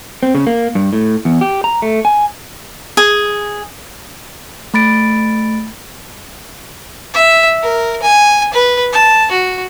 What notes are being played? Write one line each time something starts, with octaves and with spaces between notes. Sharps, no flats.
C4
C#3
A#3
G2
A2
E2
G4
A#5
A3
G#5
G#4
A3 B5 A6 D7
E5
A#4
G#5
B4
A5
F#4